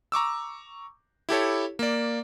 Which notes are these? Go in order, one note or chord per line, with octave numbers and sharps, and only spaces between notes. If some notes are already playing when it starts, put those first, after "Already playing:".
A#5 C#6 D6 E6
E4 G4 A4 C#5
A#3 D5